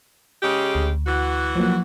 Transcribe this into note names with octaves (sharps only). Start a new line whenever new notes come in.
C#3 G#3 G4
D2
E3 F#4
F3 F#3 A#3